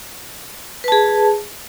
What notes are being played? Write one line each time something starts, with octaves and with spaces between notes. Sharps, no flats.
G#4 B4 A5